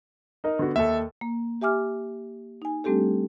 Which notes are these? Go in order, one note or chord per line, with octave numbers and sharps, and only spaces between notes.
D#4 A#4 D#5
D3 B3 F#4
D#2 A4 E5
A#3
G4 E5 G#5 D6 F6
D#4 G#5
G3 A3 C4 D4 G4 A4